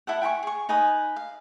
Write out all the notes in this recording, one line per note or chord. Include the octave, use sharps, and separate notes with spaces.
E4 A4 F#5
G5 G#5 B5 C#6
G#4 C#6
D#4 B4 G#5 D#6
F5